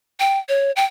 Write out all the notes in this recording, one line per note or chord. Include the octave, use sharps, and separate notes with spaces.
G5
C#5
G5